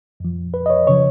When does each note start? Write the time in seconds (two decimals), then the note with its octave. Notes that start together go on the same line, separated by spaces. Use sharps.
0.20 F2 F3
0.54 B4
0.66 D#5
0.70 C#5
0.87 C#3 F3 C#5